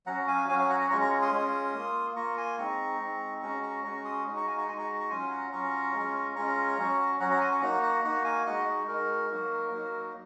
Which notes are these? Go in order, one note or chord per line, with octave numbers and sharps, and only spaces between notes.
F#3 C#4 F#4 F#5 A#5
F5 G#5
F#3 C#4 F#4 F5 G#5
F5 G#5
F#5 A#5
F#5 A#5
G#3 C#4 F4 A#5 C#6
A#5 C#6
C6 D#6
G#3 C#4 F4
A#3 F4
A#3 F4 A#5 C#6
G#5 C6
G#3 C4 D#4 A#5 C#6
G#3 C4 D#4
G#3 C#4 F#4 A#5 C#6
A#5 C#6
G#3 C#4 F#4 A#5 C#6
C6 D#6
G#3 D#4 F#4
A#5 C#6
F5 G#5
A#5 C#6
G#3 D#4 F#4 G#5 C6
A#5 C#6
A#5 C#6
F#3 C#4 F4 G#5 C6
F#5 A#5
F#3 C#4 F4 A#5 C#6
G#3 C#4 F4
G#3 C#4 F4 A#5 C#6
F#3 C#4 F#4
F#3 C#4 F#4 F#5 A#5
F#5 A#5
G#5 C6
A#5 C#6
A#3 D#4 F#4 F#5 A#5
F#5 A#5
A#3 D#4 F#4 F#5 A#5
F5 G#5
G#3 D#4 F#4 D#5 F#5
G#3 D#4 F#4 A#4
F#3 A#3 D#4 F#4
F#3 A#3 D#4 F#4